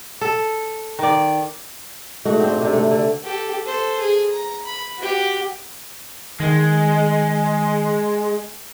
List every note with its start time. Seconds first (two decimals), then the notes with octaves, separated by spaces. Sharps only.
0.21 A4
0.99 D#3 D5
2.25 G#2 A3 F#4
2.40 C4 D4 C5
2.58 C3 D4
2.73 A3
2.91 D3
3.23 G4 A4
3.64 A4 C5
3.99 G#4
4.31 A#5
4.65 B5
4.97 F#4 G4
6.40 D#3 G#3